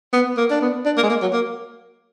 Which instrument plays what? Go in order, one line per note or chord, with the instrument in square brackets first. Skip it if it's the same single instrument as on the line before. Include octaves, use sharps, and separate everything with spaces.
[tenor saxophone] B3
A#3
D4
B3
D4
A#3
G#3
A#3
F#3
A#3